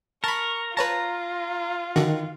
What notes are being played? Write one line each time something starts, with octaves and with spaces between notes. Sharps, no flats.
A#4 A5 B5 C#6
F4 B4 C#5 A5 A#5
D3 D#3 F#4